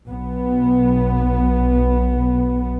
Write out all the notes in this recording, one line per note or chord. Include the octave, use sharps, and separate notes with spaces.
B1 B3